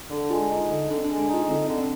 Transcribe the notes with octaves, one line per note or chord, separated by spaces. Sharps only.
D3
G#3 F4
D#4
D3
D3 D4
C4
D4
G#3
D4
D#4 F4
D3 C4
D3
C4